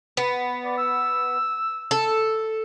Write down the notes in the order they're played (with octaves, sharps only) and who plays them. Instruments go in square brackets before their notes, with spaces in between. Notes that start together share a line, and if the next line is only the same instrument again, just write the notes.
[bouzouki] B3
[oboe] D5
E6
[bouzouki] A4